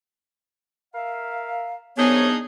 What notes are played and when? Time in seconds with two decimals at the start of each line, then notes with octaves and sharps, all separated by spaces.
0.93 A#4 E5 F5
1.97 C2 F#3 B3 D4 D#4 G#4 C#5